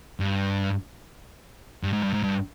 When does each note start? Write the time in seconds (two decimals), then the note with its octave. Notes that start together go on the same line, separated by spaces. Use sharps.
0.20 G2
1.83 G2
1.93 G#2
2.03 G2
2.13 G#2
2.23 G2